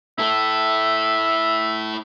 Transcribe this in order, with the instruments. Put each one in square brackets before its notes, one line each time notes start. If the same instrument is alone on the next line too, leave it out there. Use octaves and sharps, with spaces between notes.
[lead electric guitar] E4 A4 [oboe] E5